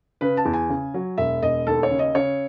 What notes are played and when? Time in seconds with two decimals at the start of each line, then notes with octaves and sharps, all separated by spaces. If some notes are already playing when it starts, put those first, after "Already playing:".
0.21 C#3 B4
0.37 A5
0.45 E2
0.53 G#5
0.69 C#3
0.94 F#3
1.18 E1 E5
1.42 E1 D#5
1.67 D#2 A4
1.83 C#5
1.91 C#3
1.99 D#5
2.15 C#3 C#5